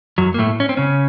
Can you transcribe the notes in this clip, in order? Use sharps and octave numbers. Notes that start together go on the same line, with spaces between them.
F#2 F#3
A#3
A2 A3
C#4
C4
C#3 C#4